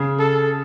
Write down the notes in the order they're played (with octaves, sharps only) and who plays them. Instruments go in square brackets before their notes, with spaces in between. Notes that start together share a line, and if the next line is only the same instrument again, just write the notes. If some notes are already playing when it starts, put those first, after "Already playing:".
Already playing: [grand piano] C#3
[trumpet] A4